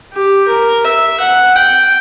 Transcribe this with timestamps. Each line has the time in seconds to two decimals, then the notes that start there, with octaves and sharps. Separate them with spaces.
0.13 G4
0.48 A#4
0.85 E5
1.20 F#5
1.56 G5